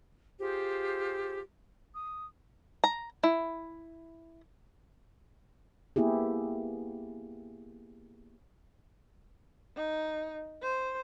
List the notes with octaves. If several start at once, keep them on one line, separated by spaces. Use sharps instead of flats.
F4 G4 G#4 C5
D#6
A#5
E4
A#3 B3 E4 G4 G#4
D#4
C5